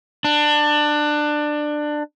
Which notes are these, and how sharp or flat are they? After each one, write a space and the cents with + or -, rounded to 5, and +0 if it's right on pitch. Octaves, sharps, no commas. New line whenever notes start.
D4 +20